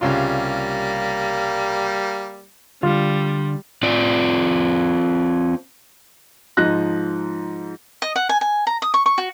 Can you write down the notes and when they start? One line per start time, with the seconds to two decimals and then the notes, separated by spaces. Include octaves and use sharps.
0.01 C2 C#3 G3 A#3 F4
2.83 D3 G3 F4
3.83 C4 F4 D5
6.57 G#2 F3 D#4 F#6 A#6
8.02 D#5
8.16 F#5
8.29 G#5
8.41 G#5
8.67 A#5
8.82 D#6
8.94 C#6
9.06 C#6
9.18 F#4